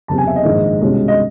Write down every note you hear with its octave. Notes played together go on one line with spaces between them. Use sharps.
F#1 E2 C3 A5
G#5
E5
D#5
A#1 G#2 D#3 G#3
C2 B2 G#3 C#4
D#5